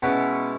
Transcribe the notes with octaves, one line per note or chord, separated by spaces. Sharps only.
B2 G#3 B3 C#4 E4 B4